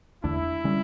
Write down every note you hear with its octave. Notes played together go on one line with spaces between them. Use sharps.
E2 D3 A3 D4 E4
D3 G3 C#4